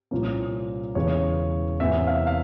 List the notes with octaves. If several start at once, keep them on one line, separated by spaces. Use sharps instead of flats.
C2 A#2 F3 A#3 C#4
E1 E2 C#3 E3 C#5
E2 C3 E3 A#3 C#4 E5
F5
F5